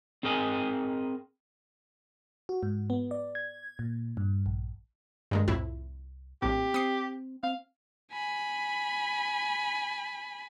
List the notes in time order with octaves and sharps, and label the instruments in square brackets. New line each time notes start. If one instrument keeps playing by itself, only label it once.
[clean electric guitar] C4 G#4 A#4 D#5 G#5
[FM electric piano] F#4
G#2
B3
D5
G#6
A#2
G2
A#1
[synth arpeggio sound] G2 D#3 G#3
[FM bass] C2 [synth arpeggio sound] F2 A2 E4
[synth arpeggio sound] A#1 A2 [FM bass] C4 [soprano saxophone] G4
[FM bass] C4 [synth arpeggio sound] D#6 C7
[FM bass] C4 [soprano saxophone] F5
[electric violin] G#5 B5